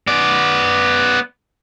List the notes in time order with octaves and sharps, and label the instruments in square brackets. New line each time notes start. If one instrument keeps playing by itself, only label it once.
[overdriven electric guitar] B3 D5